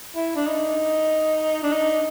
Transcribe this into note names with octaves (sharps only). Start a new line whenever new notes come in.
E4
D4
D#4
D4
D#4